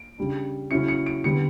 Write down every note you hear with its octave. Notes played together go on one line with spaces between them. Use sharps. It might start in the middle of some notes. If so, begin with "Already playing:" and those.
Already playing: D7
C#3 G3 D4
C#3 F#3 C#4 E4 C#7
C#7
D7
D3 G3 B3 C#7